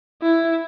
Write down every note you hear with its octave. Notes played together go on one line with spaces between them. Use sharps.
E4